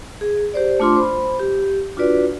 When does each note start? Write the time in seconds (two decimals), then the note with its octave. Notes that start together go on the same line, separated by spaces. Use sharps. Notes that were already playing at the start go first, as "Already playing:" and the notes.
0.21 G#4
0.54 G4 C5 D5
0.80 A3 D4 F4 C6 D6
0.96 C5 B5
1.40 G4
1.97 D4 F4 F#4 B4 D5